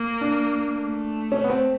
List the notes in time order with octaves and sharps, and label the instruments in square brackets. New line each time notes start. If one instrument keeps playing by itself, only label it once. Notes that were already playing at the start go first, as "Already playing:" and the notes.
Already playing: [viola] A#3
[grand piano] D4
[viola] A3
[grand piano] C#4
B3
C4